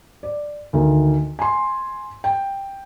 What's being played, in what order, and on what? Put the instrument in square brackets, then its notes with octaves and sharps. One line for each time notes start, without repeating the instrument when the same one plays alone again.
[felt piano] D5
D2 D#3
G#5 C6
G5